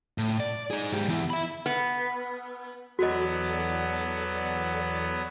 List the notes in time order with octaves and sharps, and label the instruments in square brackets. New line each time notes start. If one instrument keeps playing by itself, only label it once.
[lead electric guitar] A2
D5
D#4 G#4
G#2 G4
E2 E4
E5 B5
[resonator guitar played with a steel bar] B3
[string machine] E2 A4 D5 [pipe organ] F#3 B3 [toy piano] F#4 D#5